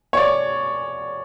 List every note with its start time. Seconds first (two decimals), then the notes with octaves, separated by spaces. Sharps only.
0.13 C#5
0.17 D5